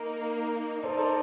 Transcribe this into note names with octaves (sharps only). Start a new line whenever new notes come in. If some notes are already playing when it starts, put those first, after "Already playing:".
Already playing: A#3 D#4 A#4
D#4 A4 A#4 C5 D5
A4 C5